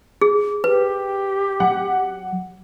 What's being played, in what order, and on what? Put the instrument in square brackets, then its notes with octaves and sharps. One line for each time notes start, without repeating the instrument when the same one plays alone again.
[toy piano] G#4
[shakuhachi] G4 [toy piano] B4
[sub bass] F#3 [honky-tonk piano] F#5